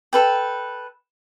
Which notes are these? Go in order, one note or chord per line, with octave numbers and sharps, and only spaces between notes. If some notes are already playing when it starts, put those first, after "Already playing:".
A4 B4 G5